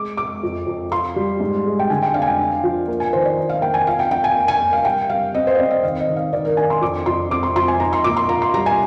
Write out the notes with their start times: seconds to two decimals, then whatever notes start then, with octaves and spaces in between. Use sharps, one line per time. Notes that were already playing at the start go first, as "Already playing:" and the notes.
Already playing: G#3 D6
0.17 G#3 D6
0.43 F2
0.67 F2
0.92 F4 C6
1.16 G3
1.40 G#2
1.66 G#3
1.79 G5
1.90 D3 G#5
2.02 G5
2.14 D4 F5
2.22 G#5
2.27 G5
2.39 D4
2.63 F3
2.88 A#3
3.00 G#5
3.13 D#3 C5
3.25 D5
3.37 D#4
3.49 F5
3.62 A#3 G5
3.74 G#5
3.87 F4 F5
3.99 G5
4.11 D4 G5
4.24 G#5
4.35 A#3
4.48 G#5
4.61 A#3
4.73 F5
4.85 G3 G5
5.09 G3 F5
5.35 C4 D#5
5.47 C5
5.55 D#5
5.58 C4 D5
5.71 D#5
5.83 D#3 F5
6.00 D#5
6.08 D#3
6.16 F5
6.33 D#3 D5
6.45 A#4
6.57 D4 G#5
6.70 C6
6.81 F2 D6
7.06 F2 C6
7.31 C4 D6
7.43 C6
7.55 F3 C6
7.68 G#5
7.80 D#4 A#5
7.93 C6
8.04 A#2 D6
8.17 C6
8.29 F4 A#5
8.42 C6
8.54 G3 A#5
8.66 G#5